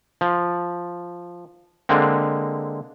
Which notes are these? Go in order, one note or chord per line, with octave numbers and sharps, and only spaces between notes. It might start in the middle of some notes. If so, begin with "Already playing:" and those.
F3
D3 G#3 A#3 C4